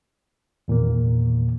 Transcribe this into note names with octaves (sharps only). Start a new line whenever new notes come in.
E2 A#2 D#3 A#3